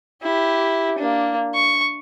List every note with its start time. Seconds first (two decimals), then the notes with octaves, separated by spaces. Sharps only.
0.22 E4 G4
0.98 A#3 D4
1.54 C#6